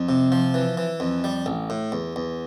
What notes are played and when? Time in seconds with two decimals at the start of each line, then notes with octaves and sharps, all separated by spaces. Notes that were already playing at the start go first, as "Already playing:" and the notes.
Already playing: F2
0.09 C3
0.32 F3
0.54 E3
0.77 E3
1.00 F2
1.24 G3
1.46 A1
1.70 A2
1.92 E2
2.16 E2